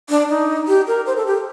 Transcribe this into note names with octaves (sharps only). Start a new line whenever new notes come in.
D4
D#4
G4
A#4
C5
A4
G4